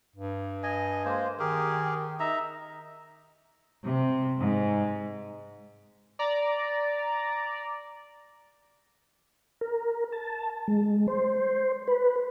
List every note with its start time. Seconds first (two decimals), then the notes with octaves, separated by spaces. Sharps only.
0.16 G2
0.63 D#5 G#5
1.05 G#3 A#3 C5
1.39 D#3 G4 G#4 A#4
2.20 D#4 E5 A#5
3.85 C3
4.39 G#2
6.19 D5 A#5
9.61 A#4
10.12 A5
10.68 G#3
11.08 C5
11.88 B4